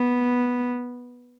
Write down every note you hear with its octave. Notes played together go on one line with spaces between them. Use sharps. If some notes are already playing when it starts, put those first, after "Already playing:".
Already playing: B3